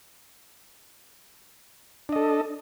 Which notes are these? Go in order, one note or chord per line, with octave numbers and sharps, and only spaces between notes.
D4 A4 D#5